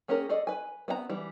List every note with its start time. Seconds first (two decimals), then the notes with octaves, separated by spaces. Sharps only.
0.08 A#3 C#4 G4 G#4 A#4
0.29 G#4 A4 D5 D#5
0.47 B4 G#5
0.88 B3 C4 F5 A#5
1.10 E3 G3